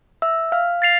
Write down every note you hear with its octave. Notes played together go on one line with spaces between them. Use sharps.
E5 E6
F5 F6
A6 C7 F7